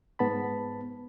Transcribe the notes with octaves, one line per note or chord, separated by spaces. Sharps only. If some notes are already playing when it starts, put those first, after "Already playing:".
G#2 B3 A5 B5